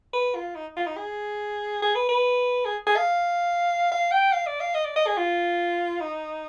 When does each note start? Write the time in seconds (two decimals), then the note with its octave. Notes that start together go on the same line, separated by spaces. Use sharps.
0.13 B4
0.35 F4
0.55 D#4
0.76 F4
0.86 D#4
0.97 G#4
1.82 G#4
1.95 B4
2.09 B4
2.65 G#4
2.86 G#4
2.97 F5
3.91 F5
4.12 G5
4.33 F5
4.47 D5
4.60 F5
4.74 D#5
4.85 D5
4.96 D#5
5.07 G#4
5.17 F4
6.01 D#4